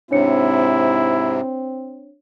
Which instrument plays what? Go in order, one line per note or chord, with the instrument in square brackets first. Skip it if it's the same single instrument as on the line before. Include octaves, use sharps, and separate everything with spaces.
[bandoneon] G#2 C3 [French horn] C4 [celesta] D4 C#5 C#7 [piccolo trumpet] E4